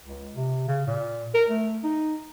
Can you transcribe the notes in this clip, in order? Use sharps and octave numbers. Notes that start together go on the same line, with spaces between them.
C#2
C3
C#3
A#2
A#4
A3
D#4